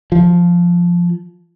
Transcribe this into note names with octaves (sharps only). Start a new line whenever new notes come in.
F3